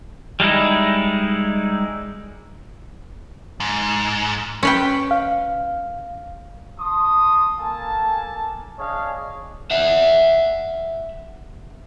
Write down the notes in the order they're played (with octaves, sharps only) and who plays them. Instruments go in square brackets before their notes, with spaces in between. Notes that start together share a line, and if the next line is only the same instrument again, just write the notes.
[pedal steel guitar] G3 G#3 D#4 E4
[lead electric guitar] G#2
[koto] C#4 B4 G5
[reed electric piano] F5
[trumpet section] A5 C6 D#6
A#3 A4 G#5 A5
D4 G#4 C#5 D#5 F5
[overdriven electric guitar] E5 F#5